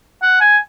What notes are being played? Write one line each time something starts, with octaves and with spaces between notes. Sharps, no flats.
F#5
G#5